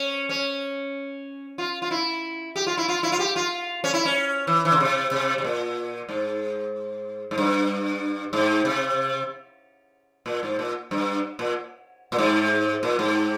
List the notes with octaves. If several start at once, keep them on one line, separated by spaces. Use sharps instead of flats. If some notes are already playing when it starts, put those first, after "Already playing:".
Already playing: C#4
C#4
F4
F4
E4
G4
F4
E4
F4
E4
F4
G4
F4
C#4
E4
C#4
E3
E3
C#3
C3
C3
C3
A#2
G#2
G#2
G2
G#2
C3
A#2
G#2
A#2
G2
A#2
A#2
G#2
A#2
G#2